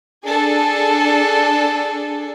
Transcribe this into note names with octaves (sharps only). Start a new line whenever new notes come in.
D4 G#4 A4